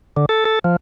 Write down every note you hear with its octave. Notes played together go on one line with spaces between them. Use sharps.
D3
A4
A4
F3